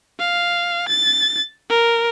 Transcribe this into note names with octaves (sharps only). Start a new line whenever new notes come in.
F5
A6
A#4